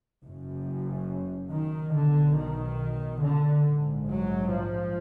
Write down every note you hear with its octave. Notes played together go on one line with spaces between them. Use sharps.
F#1 F#2
D#3
B1 B2 D3
D#3
D3
A#1 G#2
F#3
F3